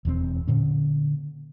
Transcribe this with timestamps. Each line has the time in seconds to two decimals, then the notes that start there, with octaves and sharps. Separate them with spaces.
0.05 E1 E2 F#3 C4
0.48 A#2 D3 C#4